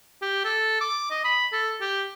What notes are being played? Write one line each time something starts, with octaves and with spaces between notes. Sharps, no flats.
G4
A4
D6
D#5
B5
A4
G4